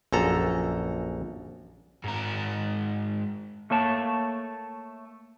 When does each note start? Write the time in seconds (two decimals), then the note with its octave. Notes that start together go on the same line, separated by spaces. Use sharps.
0.13 A#1 F#2 A4 A#5
2.04 G#2 A#4
3.70 A3 A#3 C#5 A5